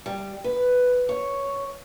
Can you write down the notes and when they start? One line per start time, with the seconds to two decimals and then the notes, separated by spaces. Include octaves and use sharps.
0.06 G3
0.44 B4
1.09 C#5